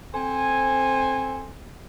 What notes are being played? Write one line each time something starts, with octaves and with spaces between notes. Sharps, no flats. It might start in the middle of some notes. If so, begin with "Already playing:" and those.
C4 A4 C5 G#5